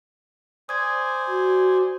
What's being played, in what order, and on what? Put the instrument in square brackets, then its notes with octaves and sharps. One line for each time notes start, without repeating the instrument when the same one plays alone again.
[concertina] C5 D5 G#5 [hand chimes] D#6 G#6
[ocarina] F#4